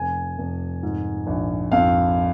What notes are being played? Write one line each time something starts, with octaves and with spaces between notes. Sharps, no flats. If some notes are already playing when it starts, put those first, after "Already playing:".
Already playing: F1 G#5
F1
G#2
A#1
F2 F5